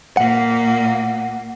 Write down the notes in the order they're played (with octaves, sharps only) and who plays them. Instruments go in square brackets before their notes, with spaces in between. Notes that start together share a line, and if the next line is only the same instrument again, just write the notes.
[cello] A#2 A#3 [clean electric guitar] F#5